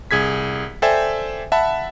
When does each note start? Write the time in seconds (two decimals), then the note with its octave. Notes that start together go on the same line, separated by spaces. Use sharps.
0.11 C2 G#4 G#6 B6
0.82 A4 C5 D5 E5 G5 G#5
1.52 E5 F#5 A5 B5